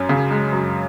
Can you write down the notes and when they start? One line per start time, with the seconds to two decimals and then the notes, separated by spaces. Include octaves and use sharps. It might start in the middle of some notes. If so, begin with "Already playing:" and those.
Already playing: F#2 C#4
0.09 C#3
0.31 G#3
0.52 F#2